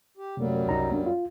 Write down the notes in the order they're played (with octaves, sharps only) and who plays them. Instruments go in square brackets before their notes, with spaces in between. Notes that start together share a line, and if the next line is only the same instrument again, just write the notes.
[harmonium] G4
[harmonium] F#2 F#3 G3 [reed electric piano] C3 A3 A#3
[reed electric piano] C2 D#4 A#5
A#3 D4
F4